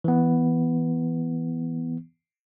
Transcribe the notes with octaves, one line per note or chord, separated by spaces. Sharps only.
E3 B3